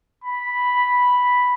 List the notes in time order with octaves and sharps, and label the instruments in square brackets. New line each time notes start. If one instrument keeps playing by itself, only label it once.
[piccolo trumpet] B5